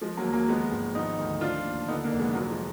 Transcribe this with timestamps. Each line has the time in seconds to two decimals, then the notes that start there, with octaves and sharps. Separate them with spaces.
0.01 F3 G#3
0.17 F#3 A#3
0.25 D#2
0.33 F#3 A#3
0.48 F3 G#3 B3
0.71 G#1
0.95 F3 B3 D#4
1.18 D2
1.41 F3 D4 F4
1.65 D#2
1.88 D3 B3 D#4
2.04 A#3 D4
2.12 F1
2.19 G#3 B3
2.31 B3
2.35 F3 F#3 A#3
2.50 F3 G#3